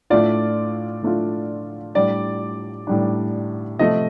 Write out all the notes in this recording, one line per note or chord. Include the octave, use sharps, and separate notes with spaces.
A2 A3 D4 F4 D5
A2 A3 D4 F4
A2 G3 D4 D5
A2 G3 D4
C3 F3 A3 D#5